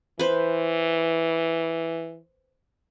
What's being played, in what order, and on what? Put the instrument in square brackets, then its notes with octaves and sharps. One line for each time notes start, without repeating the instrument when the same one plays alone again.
[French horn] E3 [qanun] B4 C5